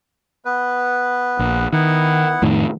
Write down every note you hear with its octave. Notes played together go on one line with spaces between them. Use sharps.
B3 B4
A#1
D#3 B3 E4 F#5
F2 A2 D#3